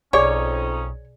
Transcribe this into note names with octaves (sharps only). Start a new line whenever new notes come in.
B1 F2 C#4 D#4 G#4 C#5 D5 G#5